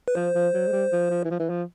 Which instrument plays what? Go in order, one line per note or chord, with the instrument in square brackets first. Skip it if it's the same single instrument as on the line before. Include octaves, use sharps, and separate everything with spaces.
[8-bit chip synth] B4
[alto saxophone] F3 [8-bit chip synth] C5
[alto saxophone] F3
F#3
G#3
G3
F3
F3
E3
F3
E3
F3